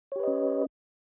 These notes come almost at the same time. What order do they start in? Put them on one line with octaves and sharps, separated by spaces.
C#5 G4 B4 D#5 C#4